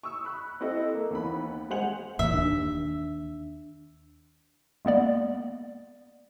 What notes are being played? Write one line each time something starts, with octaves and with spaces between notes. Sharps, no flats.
C#6 D#6 E6
B5 F#6
C4 E4 A4 D#5
A#3
D#2 E3 B3 B5
G#3 C5 F#5 G#5 F7 F#7
F1 E2 A#2 E5
D#2 D4
G#3 A#3 B3 D5